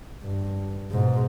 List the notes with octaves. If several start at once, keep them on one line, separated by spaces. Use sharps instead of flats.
G2
G#2 B2